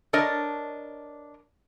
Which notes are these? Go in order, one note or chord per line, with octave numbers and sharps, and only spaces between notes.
D4 A#4 C#5 D#5